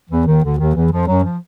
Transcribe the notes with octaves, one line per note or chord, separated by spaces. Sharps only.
E2 E3
D#2 D#3
D2 D3
D#2 D#3
E2 E3
F2 F3
F#2 F#3
F3